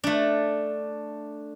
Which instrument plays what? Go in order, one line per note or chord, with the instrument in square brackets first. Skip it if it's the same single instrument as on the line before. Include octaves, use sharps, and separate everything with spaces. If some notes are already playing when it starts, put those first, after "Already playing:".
[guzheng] A3 D4